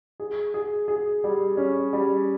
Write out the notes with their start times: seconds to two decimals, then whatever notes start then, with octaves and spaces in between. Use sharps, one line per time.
0.20 G#4
0.54 G#4
0.88 G#4
1.24 G3
1.57 C#4
1.93 G3